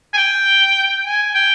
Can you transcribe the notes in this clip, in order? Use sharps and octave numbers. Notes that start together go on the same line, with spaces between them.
G#5
G5
G#5
G5